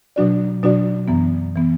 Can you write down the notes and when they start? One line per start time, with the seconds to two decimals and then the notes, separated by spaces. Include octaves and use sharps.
0.16 B2 F#3 D4 F#4 D5
0.63 B2 F#3 D4 F#4 D5
1.08 F#2 E3 B3
1.55 E3 B3